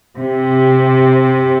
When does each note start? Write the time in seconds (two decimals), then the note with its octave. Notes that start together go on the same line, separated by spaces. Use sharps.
0.19 C3